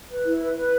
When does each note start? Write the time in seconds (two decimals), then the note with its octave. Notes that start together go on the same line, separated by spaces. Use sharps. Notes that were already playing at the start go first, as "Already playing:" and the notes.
0.09 B4
0.25 E4
0.40 B4
0.56 B4